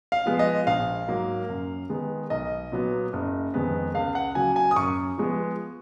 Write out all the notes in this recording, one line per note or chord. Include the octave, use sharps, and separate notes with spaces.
F5
F3 G#3 B3
D#5
A#1 F5
G#2 F#3 A#3
F#2
D#3 G#3 B3
B1 D#5
A#2 F#3 B3
F#1
F2 D#3 G#3 B3
C#2 F5
F#5
C#3 F#3 A#3 G#5
G#5
D#6
F#2 C#6
F3 G#3 B3